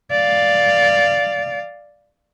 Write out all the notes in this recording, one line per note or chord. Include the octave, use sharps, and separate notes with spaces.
D5 F5